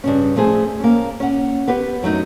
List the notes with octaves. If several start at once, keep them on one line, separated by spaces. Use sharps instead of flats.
G2 C#3 C#4
F3 A3 C4 G#4 A4
A#3 C#4
C#4 F#5
B3 G4 B4
F#2 F#3 A3 D#4